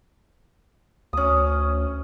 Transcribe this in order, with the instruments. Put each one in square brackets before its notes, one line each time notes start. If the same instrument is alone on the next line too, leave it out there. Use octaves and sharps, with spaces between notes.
[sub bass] D2 [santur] C#4 D#6